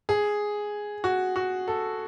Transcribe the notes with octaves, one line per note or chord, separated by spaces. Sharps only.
G#4
F#4
F#4
A4